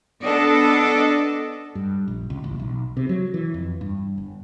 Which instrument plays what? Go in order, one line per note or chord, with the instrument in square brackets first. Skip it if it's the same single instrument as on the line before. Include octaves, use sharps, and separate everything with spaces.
[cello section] B3 D4 A4 D5 D#5
[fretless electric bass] G2
A#1
C#2
A1
B1
C3
F#3
E3
F2
G2
G1